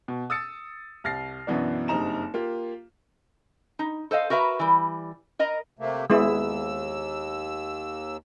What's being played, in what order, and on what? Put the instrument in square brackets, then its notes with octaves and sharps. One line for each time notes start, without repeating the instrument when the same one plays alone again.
[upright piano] B2
D#6 E6 A6 C#7
C2 F6 A6 A#6 C7
F#2 B2 E3 B3 D4
F#1 G2 C4 D#4 A#5 E7
A#3 F4 G4
[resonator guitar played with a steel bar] D#4
A4 C5 D#5 F5
F#4 A#4 B4 E5 A#5
E3 G3
A#4 D#5 A#5
[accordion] C3 A3 A#3
[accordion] D#2 E6 [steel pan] G#3 B3 E4